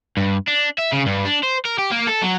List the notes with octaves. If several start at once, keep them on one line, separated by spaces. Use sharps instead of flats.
G2
D4
E5
C#3
G2
D4
C5
A#4
G4
A#3
A4
F#3